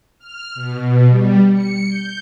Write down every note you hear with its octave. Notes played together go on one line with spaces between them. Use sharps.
F6
B2
G3
C#7
G6